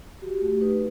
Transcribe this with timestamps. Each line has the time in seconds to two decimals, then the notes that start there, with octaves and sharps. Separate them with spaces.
0.22 F#4 G4
0.41 A3
0.61 D#4 B4